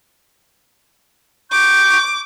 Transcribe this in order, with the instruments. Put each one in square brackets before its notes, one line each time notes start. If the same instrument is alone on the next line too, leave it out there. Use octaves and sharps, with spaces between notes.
[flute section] C#6 G6 [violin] D6